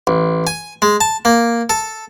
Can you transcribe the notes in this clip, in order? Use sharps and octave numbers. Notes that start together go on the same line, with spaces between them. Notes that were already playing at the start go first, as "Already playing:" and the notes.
A1
G#5
G#3
A5
A#3
A4